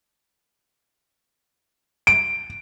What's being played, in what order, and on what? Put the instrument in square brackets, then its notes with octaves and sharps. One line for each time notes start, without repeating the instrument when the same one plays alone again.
[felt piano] D7